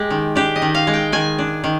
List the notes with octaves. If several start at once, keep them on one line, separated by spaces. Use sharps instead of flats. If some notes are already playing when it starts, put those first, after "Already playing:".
Already playing: G#3 G4
D#3
D4 G4
D#5
D#3
F5
G#3
G5
D#3 G#5
D4
D#3